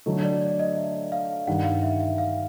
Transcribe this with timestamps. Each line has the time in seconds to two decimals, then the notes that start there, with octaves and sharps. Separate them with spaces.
0.06 D3 F#3 A3 D#5
0.24 D5
0.41 D5
0.59 D#5
0.77 E5
1.12 F5
1.47 G2 D#3 G3 F#5
1.64 F5
1.83 E5
2.00 E5
2.18 F5